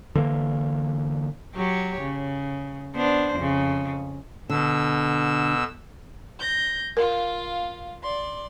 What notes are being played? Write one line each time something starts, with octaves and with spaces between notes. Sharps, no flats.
D3 E3 A#3
F#3 G4 C#5
C#3
B3 D4 C5
F2 C#3
B2 D3 E6
G6 A#6
F4 A#4 F5
D5 C6